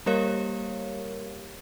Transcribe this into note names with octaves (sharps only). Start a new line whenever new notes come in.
G3 A#3 G4 A#4 C#5 F5